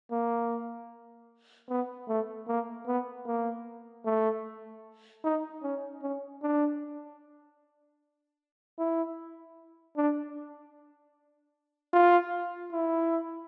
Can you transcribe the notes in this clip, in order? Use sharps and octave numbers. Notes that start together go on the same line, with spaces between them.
A#3
B3
A3
A#3
B3
A#3
A3
D#4
C#4
C#4
D4
E4
D4
F4
E4